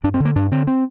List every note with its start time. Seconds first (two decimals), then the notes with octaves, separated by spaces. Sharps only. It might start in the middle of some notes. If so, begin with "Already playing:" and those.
0.04 G2 D4
0.14 C4
0.20 D3
0.25 A#3
0.35 G2 D4
0.51 D3 C4
0.67 C4